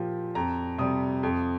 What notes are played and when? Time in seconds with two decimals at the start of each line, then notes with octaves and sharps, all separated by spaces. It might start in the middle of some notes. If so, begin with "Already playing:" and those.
Already playing: A#2 F3 G4
0.35 F2 A#5
0.78 C3 G3 D#6
1.23 F2